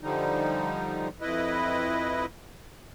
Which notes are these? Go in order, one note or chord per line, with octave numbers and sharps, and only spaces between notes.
D3 F3 G3 D#4
F2 E4 B4 D#5